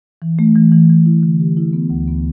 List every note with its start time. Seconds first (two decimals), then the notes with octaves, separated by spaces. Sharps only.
0.22 E3
0.39 A3
0.56 E3
0.72 E3
0.89 E3
1.06 E4
1.23 D3
1.40 G4
1.57 E4
1.73 B3
1.90 D2
2.08 B3